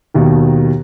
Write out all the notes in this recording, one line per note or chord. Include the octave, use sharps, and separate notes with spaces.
D#2 B2 D#3